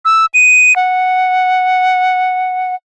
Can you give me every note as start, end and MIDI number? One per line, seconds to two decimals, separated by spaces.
0.05 0.26 88
0.34 0.75 99
0.76 2.75 78